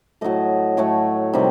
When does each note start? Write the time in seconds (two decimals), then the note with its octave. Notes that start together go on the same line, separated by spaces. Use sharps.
0.21 A2 F#3 A3 D#5
0.77 A2 F#3 A3 C#5
1.33 C3 D#3 G3